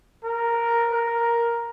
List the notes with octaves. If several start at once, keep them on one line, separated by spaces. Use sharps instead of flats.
A#4
A#4